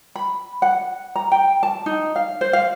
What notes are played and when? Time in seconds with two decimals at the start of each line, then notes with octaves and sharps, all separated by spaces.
0.16 B5
0.62 F#5
1.16 A#5
1.32 G5
1.63 A5
1.86 D#4
2.16 F5
2.41 C5
2.53 F5